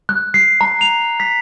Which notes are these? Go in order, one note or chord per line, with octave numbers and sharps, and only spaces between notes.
F#6
C7
A#5
F7
B6